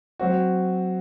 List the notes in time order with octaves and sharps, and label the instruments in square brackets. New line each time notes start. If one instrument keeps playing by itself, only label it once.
[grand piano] F#3 C4 F#4